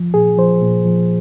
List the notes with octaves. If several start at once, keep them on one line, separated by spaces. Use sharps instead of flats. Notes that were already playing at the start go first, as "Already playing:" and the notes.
Already playing: F3
A#2 G#4
F3 C5
A#2
F3